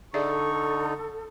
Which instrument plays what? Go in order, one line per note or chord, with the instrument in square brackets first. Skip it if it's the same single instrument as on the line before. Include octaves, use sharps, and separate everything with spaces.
[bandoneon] D3 D#4 [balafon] G#4 D5 E5 [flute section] A4 [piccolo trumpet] C#6